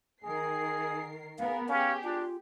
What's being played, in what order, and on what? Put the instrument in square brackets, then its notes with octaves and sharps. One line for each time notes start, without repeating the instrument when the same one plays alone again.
[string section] D#3 A#4 C7 [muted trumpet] G#4
[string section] B3 G#4 A#4 [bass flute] F5
[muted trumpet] C#4 [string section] G4 G#4 [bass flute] F5
[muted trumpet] D4 [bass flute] F4